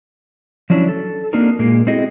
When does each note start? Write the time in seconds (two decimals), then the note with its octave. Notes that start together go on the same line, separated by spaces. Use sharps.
0.70 F3 F#3 C#4 D4 E4
0.89 A4
1.33 A#3 C4 D4 D#4 F#4 A#4
1.59 A#2 G#3 A#3
1.87 C4 E4 F#4 G#4 A4 D#5